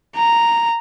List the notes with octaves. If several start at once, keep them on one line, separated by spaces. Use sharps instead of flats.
A#5